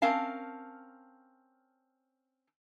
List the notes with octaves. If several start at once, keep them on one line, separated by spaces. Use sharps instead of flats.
C4 C#4 A#4 F5 A5